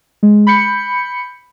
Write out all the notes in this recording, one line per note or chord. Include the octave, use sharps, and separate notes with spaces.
G#3
B5 G6 C#7